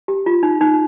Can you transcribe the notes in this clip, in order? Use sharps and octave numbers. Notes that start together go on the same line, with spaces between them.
G4
F4
D#4
D#4